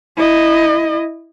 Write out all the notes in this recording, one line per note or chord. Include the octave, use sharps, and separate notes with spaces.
E4 D#5